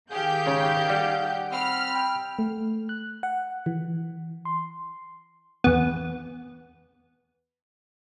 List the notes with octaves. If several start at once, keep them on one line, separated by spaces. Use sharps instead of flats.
D#3 G4 G#4 F5 G6
G#2 C#3 C#4
G3 F#5
C4 B5 F6
G5
A3
F#6
F#5
E3
C6
E2 B3